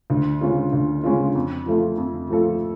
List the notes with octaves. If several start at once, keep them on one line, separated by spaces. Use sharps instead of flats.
D2
C#3 G#3 C#4 F4
D2
C#3 G#3 C#4 F4
F2
F3 A3 F4 A4
F2
F3 A3 F4 A4